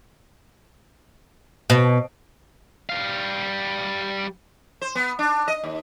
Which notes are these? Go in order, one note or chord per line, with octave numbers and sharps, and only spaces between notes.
B2
G3 F5
C5
B3
D4
D#5
D#2